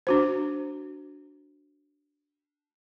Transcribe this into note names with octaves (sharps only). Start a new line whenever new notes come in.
D4 F#4 C5